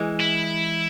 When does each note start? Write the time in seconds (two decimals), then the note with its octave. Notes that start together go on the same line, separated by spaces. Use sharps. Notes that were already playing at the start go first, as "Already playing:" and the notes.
Already playing: E3 G#3
0.20 E4